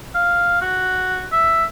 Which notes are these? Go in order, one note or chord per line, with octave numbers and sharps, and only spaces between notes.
F5
F#4
E5